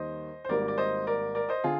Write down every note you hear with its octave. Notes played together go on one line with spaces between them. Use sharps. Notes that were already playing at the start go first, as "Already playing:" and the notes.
Already playing: D#2 D#3 G3 C5 D#5
C5
G#1 G#2 G3 A#3 A#4 D5
D5
C5 D#5
A#4 D5
A#4 D5
C5 D#5
D3 F4 G#4